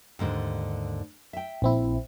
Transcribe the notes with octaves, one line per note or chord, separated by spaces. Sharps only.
D#2 G#2 D3
E5 G5
A#1 C4 E4